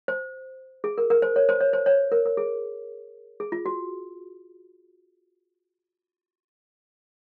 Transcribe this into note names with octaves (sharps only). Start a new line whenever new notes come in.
C5
G#4
A#4
A#4
C5
C#5
C5
C#5
C5
C#5
A#4
A#4
G#4
G#4
F4
F#4